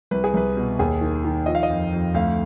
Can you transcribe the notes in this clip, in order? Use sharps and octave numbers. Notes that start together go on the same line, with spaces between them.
C2 B4
G#4
C2 B4
B2
D#2 G#4
D#3
D#3
F3 D#5
F5
D#5
F2
F2
D2 F5